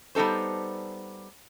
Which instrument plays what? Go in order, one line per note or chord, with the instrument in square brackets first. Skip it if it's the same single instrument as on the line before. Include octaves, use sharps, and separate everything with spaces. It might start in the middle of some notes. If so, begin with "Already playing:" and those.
[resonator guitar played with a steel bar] G3 B3 D#4 A4 C5